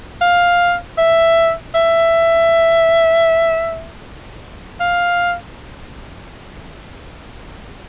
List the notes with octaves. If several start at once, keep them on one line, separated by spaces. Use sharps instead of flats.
F5
E5
E5
F5